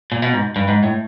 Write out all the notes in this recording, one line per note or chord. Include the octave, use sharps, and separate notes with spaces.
A#2
B2
G#2
G2
G#2
A2